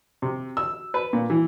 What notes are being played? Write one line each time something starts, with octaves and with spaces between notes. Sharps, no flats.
C3
E6
B4
A#2
E3